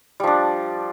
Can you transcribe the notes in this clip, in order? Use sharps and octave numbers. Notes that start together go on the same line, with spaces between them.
F3 G3 D4